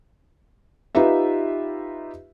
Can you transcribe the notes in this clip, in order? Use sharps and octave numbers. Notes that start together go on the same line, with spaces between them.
D#4 F4 G4 B4 E5